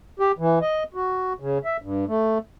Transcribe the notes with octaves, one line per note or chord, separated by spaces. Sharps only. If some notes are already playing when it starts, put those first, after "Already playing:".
G4
E3
D#5
F#4
C#3
E5
G2
A3